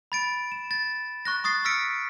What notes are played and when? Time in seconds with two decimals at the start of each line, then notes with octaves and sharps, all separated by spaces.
0.12 B5 A6 D7
0.52 E7
0.71 A6
1.25 C#6 F#6 A#6
1.44 C#6 D#6 A6 C7
1.65 E6 F6 A#6 B6 C#7 D7